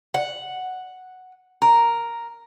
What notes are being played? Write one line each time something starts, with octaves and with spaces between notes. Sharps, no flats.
F#5
A#4